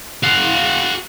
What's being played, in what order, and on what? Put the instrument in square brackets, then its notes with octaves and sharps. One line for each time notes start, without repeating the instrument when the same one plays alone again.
[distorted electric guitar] F#4 F5